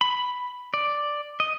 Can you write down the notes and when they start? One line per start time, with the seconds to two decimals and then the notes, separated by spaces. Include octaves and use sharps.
0.01 B5
0.74 D5
1.40 D#5